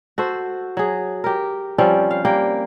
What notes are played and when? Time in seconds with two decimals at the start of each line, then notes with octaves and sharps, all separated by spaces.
0.18 F#4 A4 C5
0.77 F#3 G#4
1.24 G4 A#4
1.78 F3 G3 C4 C#4
2.11 F5
2.25 G3 A#3 G4 G5